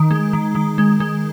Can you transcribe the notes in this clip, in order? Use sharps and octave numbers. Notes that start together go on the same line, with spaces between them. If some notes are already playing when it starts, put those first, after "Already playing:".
Already playing: D#3
G#3
D#3
D#3
G#3
G#3